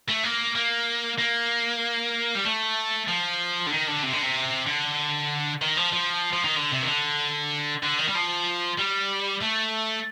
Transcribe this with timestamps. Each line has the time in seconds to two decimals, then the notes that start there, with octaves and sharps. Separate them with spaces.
0.08 A3
0.23 A#3
0.55 A#3
1.19 A#3
2.35 G3
2.45 A3
3.08 F3
3.67 D3
3.71 D#3
3.87 D3
4.03 C3
4.13 D3
4.22 C3
4.67 D3
5.61 D#3
5.77 F3
5.93 F3
6.33 F3
6.45 D#3
6.56 D3
6.72 C3
6.82 D#3
6.88 D3
7.83 D3
7.98 D#3
8.08 G3
8.15 F3
8.78 G3
9.41 A3